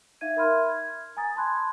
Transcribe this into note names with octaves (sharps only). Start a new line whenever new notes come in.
D#4 E5 F5 G#6 D#7
A#4 E5 B5 C6 F6 G#6
G#6
G#5 A#5 D#6 A6
A5 B5 C6 F#6 G#6